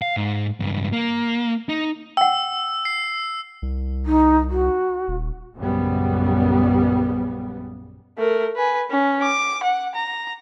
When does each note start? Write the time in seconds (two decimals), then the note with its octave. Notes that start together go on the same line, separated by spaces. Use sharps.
0.02 F5
0.17 G#2
0.60 C#2 G2
0.93 A#3
1.69 D#4
2.17 F#5 G5 E6
2.85 C7
3.62 C2
4.06 D#4
4.50 F#4
5.08 D#1
5.57 A#1 F#2 C#3 G3 B3
8.18 A3 A#4
8.56 B4 G#5
8.90 C#4
9.23 D6
9.63 F#5
9.95 A#5